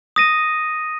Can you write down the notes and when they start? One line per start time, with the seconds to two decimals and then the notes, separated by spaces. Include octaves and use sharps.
0.16 D#6 A#6 D#7